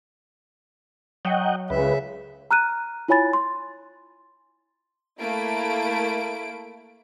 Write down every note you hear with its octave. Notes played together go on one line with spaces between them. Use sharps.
F#3 D#5 F#5 G5
C#2 C#3 B4 E5
A#5 F6 F#6 D#7
E4 F4 C#5 G#5 B5 A6
C6
A3 A#3 E4 D7